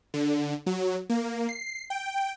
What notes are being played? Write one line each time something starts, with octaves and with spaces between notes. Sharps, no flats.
D3
F#3
A#3
C7
G5